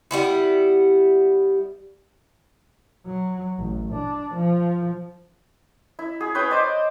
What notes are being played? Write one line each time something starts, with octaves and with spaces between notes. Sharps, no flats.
G3 B3 E4
F#3
A1
D4
F3
E4
G#4
B4 C#5 G5 D#6
C5 D5 D#5